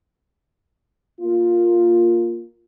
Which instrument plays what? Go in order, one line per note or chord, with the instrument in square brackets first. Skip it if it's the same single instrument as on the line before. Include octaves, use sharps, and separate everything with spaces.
[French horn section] A#3 F4